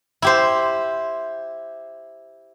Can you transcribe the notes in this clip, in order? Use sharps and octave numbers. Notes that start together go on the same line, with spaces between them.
E4 G4 C5